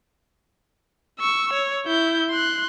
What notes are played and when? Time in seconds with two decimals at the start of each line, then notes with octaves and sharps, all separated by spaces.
1.19 C#6 E6
1.54 C#5
1.86 E4 G6
2.30 C6 F#6